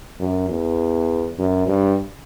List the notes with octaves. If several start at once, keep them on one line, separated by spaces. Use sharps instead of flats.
F#2
E2
F#2
G2